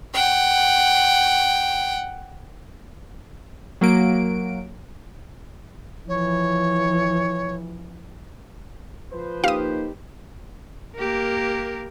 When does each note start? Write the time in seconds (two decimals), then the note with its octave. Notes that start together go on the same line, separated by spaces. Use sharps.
0.14 F#5 G5
3.81 F#3 A#3 D7
6.08 E3 F3 C#5
9.11 F3 B4 C5
9.44 A#3 D#4 G4 F5 D#6
10.97 A#3 G4 A#4